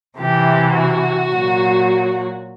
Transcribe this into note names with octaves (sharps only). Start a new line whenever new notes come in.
C3 E3 G4
F#4
A#2 F#3